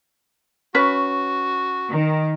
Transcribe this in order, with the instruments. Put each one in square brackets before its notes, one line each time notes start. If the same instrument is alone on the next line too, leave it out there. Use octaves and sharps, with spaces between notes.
[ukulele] C#4 B4 [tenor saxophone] F#4
[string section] D#3